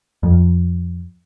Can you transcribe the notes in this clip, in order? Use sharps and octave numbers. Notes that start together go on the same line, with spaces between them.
F2